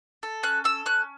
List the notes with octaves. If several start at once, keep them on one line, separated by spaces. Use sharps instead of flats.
A4
C#4 F#6
A4 E6
C#4 F#6